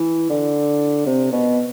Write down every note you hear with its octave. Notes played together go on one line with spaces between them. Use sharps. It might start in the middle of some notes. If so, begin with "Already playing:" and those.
Already playing: E3
D3
C3
B2